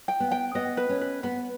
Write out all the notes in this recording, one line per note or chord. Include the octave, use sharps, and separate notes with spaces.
G5
B3
G5
B3 D#5
B4
C#4
B4
B3 B4